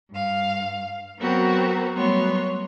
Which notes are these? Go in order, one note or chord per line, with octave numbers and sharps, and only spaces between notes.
G2 F5
F#3 B3 C4 F#4 A#4
F#3 G3 A3 B3 C#5 C6